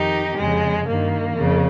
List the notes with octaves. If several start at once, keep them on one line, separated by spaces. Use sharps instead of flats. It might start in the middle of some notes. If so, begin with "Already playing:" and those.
Already playing: F2 D#3 D#4 G4
F2 C#3 G#3
G2 D#3 A#3
F2 C#3